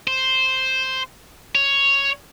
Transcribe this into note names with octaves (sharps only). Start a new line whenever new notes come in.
C5
C#5